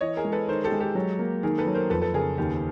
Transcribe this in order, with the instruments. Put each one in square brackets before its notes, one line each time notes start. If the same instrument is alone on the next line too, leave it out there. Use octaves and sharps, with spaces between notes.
[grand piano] E3 [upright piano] C#5 D#5
[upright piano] G#4 A#4
[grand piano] G#3
[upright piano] A4 B4
[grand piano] D#3 [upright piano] A#4 C5
[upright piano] G4 A4
[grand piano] G#3
[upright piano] G4 A4
[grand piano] F#3
A#3
[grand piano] D#3 [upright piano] G#4 A#4
[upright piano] A4 B4
[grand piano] F#3
[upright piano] A#4 C5
[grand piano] F2 [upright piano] A4 B4
[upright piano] A4 B4
[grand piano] C#3 [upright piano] G#4 A#4
[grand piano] D#2 [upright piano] G4